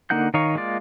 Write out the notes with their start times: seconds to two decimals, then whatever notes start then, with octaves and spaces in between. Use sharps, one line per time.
0.10 D3 A#3 D#4 F#5 G6
0.34 D#3 D#4 C#5 F5 C#6
0.55 G#3 A#3 F4 D5